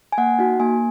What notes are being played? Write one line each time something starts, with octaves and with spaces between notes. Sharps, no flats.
G#5
A#3 F#5
D#4 F#4
A#3 G#5